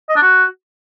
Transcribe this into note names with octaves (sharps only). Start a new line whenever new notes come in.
D#5
D4
F#4